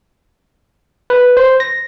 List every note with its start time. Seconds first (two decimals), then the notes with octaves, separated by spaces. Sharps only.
1.10 B4
1.37 C5
1.60 A#6